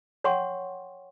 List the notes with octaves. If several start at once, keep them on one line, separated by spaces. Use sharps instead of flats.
C#5 F#5 G5 C6 C#6